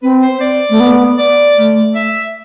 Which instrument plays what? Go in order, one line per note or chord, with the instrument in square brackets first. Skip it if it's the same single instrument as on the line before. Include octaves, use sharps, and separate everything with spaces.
[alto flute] C4 [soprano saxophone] B4
[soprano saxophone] C5
D5
[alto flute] A3
B3
[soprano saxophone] D5
[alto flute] A3
[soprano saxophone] E5